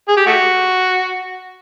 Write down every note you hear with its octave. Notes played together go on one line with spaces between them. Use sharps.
G#4
G4
A3 F#4